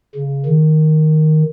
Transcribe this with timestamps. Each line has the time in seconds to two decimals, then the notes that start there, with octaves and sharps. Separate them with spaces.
0.15 C#3
0.46 D#3